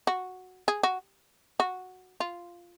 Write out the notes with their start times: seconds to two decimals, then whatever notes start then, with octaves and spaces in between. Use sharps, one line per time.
0.07 F#4
0.68 G#4
0.83 F#4
1.60 F#4
2.20 F4